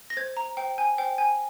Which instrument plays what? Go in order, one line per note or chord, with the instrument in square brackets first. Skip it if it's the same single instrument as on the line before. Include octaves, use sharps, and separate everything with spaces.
[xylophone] A#6
C5 G#6
A#5
C5 G5
G#5
C5 G5
G#5